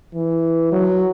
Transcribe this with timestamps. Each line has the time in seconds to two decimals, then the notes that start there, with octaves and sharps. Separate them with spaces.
0.14 E3
0.72 F#3